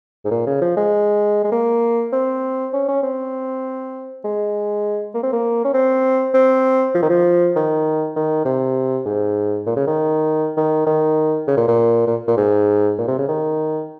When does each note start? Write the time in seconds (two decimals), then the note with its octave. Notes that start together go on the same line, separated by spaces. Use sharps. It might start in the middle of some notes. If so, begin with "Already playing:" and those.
0.25 G#2
0.31 A#2
0.47 C#3
0.61 F3
0.77 G#3
1.44 G#3
1.52 A#3
2.13 C4
2.73 C#4
2.88 C#4
3.03 C4
4.24 G#3
5.14 A#3
5.23 C4
5.33 A#3
5.65 C#4
5.74 C4
6.34 C4
6.95 F3
7.03 D#3
7.10 F3
7.56 D#3
8.16 D#3
8.45 C3
9.06 G#2
9.67 A#2
9.77 C#3
9.87 D#3
10.57 D#3
10.87 D#3
11.47 C#3
11.57 A#2
11.68 A#2
12.07 A#2
12.28 A#2
12.37 G#2
12.98 A#2
13.08 C3
13.18 C#3
13.29 D#3